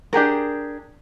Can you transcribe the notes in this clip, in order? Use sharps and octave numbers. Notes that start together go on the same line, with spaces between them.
D4 G4 G#4 A#4